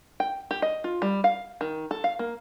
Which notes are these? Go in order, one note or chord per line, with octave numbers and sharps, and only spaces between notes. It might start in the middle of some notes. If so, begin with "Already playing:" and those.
G5
G4
D#5
F4
G3
F5
D#3
A4
F5
A#3